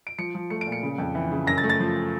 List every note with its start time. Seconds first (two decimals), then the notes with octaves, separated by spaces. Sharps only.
0.07 D7
0.18 F3 C#7
0.35 F3
0.50 A3 C#7
0.61 D7
0.66 A#2
0.72 C#7
0.83 C#3
0.98 F2
1.15 E3
1.31 C#3
1.47 F#2 A#6
1.58 A6
1.64 A3
1.69 A6
1.80 F3